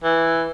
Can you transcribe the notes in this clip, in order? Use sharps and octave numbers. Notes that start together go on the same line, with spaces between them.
E3